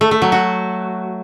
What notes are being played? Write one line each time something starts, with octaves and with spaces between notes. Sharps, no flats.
A3
A3
F#3
F#4